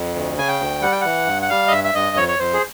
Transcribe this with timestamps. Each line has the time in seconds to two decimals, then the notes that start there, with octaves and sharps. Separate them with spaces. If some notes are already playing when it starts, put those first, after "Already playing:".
Already playing: F2
0.14 D2
0.37 C#3 G#5
0.48 G5
0.60 D2
0.81 G3 F#5
0.92 G5
1.01 E3 F#5
1.27 G2
1.42 F#5
1.49 G3 F5
1.68 D#5
1.71 G2 E5
1.84 E5
1.95 G2 D#5
2.16 F2 C#5
2.28 C#5
2.39 F2 C5
2.54 G#4